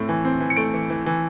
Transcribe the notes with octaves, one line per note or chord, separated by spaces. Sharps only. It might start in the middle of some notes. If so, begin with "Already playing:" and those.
Already playing: A2 A3 C4
E3
C4
E3
C#7
A3 D7
E3
E3
E3